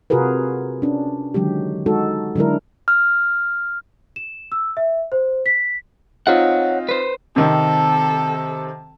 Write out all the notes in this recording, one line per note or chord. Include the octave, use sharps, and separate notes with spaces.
C3 F4 F#4 G#4 A#4 B4
C#4 D4
D3 D#3 F#3 G#3 G4
G#3 D#4 F#4 A4
D3 F#3 G#3 D4 E4 A#4
F6
E7
E6
E5
C5
B6
C4 D#4 F4 C#5 F#5
B4 C5
C3 D#3 C4 A4